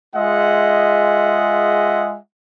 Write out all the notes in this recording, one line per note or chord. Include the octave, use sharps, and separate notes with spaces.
G#3 F4 G#4 D#5 E5 F#5